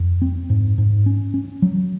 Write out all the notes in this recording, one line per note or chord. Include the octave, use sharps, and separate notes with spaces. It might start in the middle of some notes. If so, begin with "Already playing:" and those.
Already playing: F2
C4
G#2
G#2
C#4
C#4
F#3